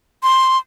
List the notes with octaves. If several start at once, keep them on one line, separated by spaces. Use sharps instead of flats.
C6